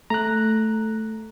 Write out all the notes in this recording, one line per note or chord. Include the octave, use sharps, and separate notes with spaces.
A3 A#5 F#6